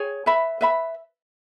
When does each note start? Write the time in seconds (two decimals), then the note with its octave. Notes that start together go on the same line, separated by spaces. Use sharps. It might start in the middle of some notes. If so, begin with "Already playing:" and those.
Already playing: G#4 C#5 G#5
0.26 B4 E5 B5
0.61 B4 E5 B5